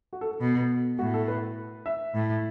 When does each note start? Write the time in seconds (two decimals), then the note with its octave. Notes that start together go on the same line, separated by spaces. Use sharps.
0.13 F#4
0.21 A4
0.31 A4
0.40 B2
0.99 A2 F#4
1.14 A4
1.28 B4
1.86 E5
2.15 A2